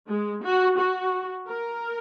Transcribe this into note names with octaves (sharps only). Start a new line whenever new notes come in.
G#3
F#4
F#4
A#4